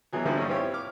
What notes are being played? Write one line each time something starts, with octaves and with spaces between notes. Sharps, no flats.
B2 E3 F#3 G#4
D3 F3 G3 A3 A#3 D#4
G2 E3 B3 C#4 C#5 D5
C4 E4 F4 G4 C#5
D6 F6